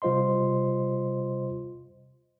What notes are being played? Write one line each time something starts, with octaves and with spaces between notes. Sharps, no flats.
C3 G3 F4 C5 D#5 C6